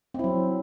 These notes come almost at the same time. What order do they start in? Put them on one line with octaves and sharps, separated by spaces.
C4 E4 F#3